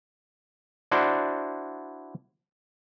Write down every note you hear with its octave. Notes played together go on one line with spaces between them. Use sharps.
D4 E4 F#4 C5 D5